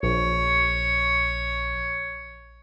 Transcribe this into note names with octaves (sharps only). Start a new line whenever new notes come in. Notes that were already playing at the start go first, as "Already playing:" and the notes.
A#1 C#5